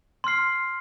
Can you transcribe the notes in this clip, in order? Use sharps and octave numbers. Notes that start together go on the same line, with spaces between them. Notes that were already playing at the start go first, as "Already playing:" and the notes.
C6 F6 C7